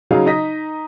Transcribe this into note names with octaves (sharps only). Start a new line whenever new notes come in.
C#3 F#3 D#4 F5
D#4 D#5 A#6 B6